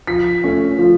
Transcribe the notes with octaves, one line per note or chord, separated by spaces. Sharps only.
F3 B6
A3 C#4
F3